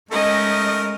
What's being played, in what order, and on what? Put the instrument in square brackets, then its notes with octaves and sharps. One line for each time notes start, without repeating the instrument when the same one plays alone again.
[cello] G#3 [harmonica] A3 D#4 A#4 [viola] C#4 D#5